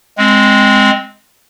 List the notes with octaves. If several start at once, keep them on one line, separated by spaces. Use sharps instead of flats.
G#3 C4